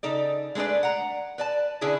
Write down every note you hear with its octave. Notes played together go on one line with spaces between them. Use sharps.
C#3 D#4 A4 D5
G#3 A3 D4 B4 D5
F#5 A#5
B4 D5 A5
D3 C#4 D4 E4 G#4 B4